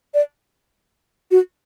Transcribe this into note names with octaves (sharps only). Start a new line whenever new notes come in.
D5
F#4